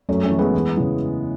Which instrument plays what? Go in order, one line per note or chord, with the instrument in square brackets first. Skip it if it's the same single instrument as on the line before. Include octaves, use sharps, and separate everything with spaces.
[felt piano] F#2 A3 C#4
A3 C#4
E3
G#3 B3
E2
C#3 E3